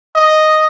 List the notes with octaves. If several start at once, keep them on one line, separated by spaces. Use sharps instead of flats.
D#5